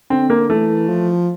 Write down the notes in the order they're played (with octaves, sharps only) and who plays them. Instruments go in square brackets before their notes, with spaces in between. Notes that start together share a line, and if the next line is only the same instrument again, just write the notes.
[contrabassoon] D3 [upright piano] C4
[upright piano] A#3
[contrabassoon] E3 [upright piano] A3
[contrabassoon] F3